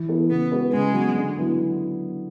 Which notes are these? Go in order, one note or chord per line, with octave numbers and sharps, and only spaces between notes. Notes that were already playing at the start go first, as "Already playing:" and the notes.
Already playing: E3
B3 E4 A4
C#3 B3
G#3 B3 F#4 B4
C#3 G#3
F#3 B3 F#4
D3
F#3 B3 E4